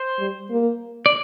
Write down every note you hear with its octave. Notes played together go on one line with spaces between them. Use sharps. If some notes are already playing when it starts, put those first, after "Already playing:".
Already playing: C5
G3
A#3
D5